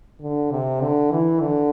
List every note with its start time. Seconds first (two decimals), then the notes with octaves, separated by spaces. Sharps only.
0.22 D3
0.52 C3
0.81 D3
1.11 E3
1.40 D3